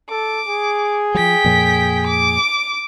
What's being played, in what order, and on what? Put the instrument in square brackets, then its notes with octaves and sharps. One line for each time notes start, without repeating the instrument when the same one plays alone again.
[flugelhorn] A4 [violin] D6
[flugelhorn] G#4
[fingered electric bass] F3 F#3 [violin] G5 B6
[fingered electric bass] F2 A#2 F3
[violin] D6